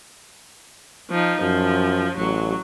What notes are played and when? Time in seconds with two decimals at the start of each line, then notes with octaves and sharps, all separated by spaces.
1.11 F3 D#4
1.42 F#2 F3
2.17 A1 F#3